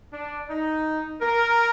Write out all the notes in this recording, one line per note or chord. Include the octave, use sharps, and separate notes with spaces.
D4
D#4
A#4